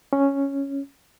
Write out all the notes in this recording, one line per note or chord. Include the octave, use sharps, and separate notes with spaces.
C#4